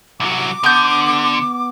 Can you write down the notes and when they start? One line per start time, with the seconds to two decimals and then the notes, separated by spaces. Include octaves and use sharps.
0.20 C2 F#3 D6
0.63 D3 B3 G6